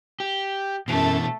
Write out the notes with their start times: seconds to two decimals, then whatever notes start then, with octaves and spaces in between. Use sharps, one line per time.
0.20 G4
0.88 F#2 B2 E3 A3 A4